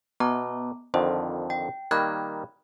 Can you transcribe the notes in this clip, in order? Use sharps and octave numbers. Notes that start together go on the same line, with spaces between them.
B2 B3 A#5 D6
F2 D3 D#3 C5
G5
D#3 G3 A#3 B5 F#6 G#6